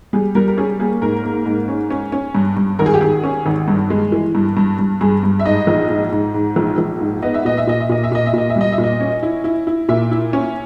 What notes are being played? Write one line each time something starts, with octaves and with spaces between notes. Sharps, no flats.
G3 G#4
G3 A#4
A#4
C#4 G#4
A#3 G#4
G#2 A#4
A#3
G#2
C#4
C#4
C#4
G2
G2
G#1 A#4
G#4
G4
G#1 G#4
C#4
G#1
G2
G#3
E3
G2
G2
G2
G2 G#4
G2
E5
G#2 D#5
A#1
G#2
G#2
G#2
A#1
A#1
G#2
B3 D#5
E5
A#2 D#5
E5
A#2 D#5
E5
A#2 D#5
E5
A#2 D#5
E5
A#2 D#5
E5
G3 D#5
E5
A#2
D#5
C#4
E4
E4
E4
A#2 E5
E4
C#4